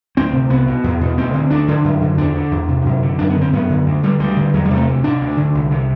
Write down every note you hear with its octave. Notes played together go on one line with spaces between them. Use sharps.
D2 C4
C3
C2 B3
B2
E2
B2
D2 C4
D3
D2 D4
D3
F#2
D3
E2 D4
D3
E2
C3
F#2
D3
F#2 D4
B3
D3 C4
F#2 B3
D3
D2
D3 G3
D2 G3
D3
E2 F#3
G3
C3
A3
D2
C3 D4
D2
D3
C2
C3